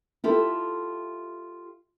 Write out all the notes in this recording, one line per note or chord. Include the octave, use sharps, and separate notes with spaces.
E4 F4 G4 A4